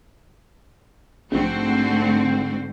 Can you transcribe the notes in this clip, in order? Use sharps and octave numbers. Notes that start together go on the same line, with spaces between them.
A#1 G#2 D3 A3 C4 F#4